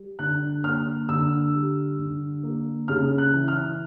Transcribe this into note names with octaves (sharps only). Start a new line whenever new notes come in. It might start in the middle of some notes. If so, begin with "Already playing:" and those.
Already playing: G3
D3 F#6
A#3 F6
D3 E6
G3
D3
A#3
C#3 F6
F#6
E3
F6